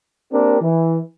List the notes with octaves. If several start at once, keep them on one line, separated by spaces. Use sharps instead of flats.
A#3 C4 D4 G4 A#4
E3